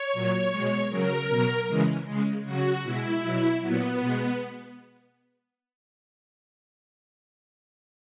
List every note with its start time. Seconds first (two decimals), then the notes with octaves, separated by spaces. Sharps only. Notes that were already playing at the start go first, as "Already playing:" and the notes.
Already playing: C#5
0.13 A#2 F#3
0.52 B2 G#3
0.90 C#3 F#3 A#4
1.29 B2 F#3
1.68 C#3 E3 G#3
2.07 C#3 G#3
2.45 C#3 F#3 F#4
2.83 B2 G#3 E4
3.23 B2 F#3
3.61 A#2 F#3 B3
4.00 B2 G#3